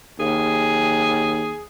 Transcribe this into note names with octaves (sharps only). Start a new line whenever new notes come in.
D#2 G#4